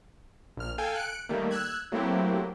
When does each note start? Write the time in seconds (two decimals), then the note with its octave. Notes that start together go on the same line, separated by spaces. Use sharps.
0.57 A#1 F6
0.78 A4 F5 G5 G#5
0.95 F#6 C#7 D7
1.29 D#3 G3 A3 A#3
1.51 E6 F#6 G#6
1.92 F#3 A3 A#3 C4 E4 G4